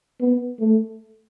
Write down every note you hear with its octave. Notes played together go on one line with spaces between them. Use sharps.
B3
A3